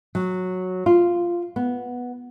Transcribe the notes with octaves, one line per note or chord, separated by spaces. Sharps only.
F#3
F4
B3